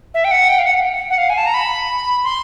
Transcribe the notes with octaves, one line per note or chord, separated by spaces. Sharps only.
E5
G5
F#5
G5
F5
F#5
F#5
F5
G#5
A5
A#5
B5
C6